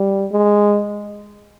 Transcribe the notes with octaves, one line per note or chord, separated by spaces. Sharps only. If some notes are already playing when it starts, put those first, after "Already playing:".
Already playing: G3
G#3